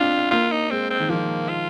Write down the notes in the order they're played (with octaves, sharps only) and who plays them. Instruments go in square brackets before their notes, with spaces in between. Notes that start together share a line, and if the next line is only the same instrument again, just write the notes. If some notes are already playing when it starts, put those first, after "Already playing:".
Already playing: [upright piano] C4 D4 [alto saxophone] F4
[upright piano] A#3 [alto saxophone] F4
[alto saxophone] D#4
[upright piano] G#3 [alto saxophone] C4
[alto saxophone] C4
[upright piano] D#3
[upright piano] F3 [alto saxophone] A#3
[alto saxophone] F4